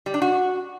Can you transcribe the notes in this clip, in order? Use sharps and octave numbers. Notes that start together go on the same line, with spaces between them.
G3
D4
F#4